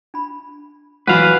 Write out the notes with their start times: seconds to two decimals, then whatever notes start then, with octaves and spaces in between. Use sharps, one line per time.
0.14 D4 B5
1.07 E3 F#3 F4 F#4 B4 F5 F#5